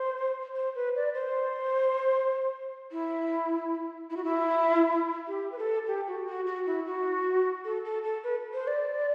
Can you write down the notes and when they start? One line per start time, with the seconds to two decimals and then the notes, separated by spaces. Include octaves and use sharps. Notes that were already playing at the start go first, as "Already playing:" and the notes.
Already playing: C5
0.56 C5
0.75 B4
0.96 D5
1.14 C5
2.92 E4
4.10 E4
4.17 F#4
4.24 E4
5.28 G4
5.52 B4
5.58 A4
5.87 G4
6.08 F#4
6.27 F#4
6.47 F#4
6.66 E4
6.86 F#4
7.65 A4
7.85 A4
8.04 A4
8.24 B4
8.54 C5
8.67 D5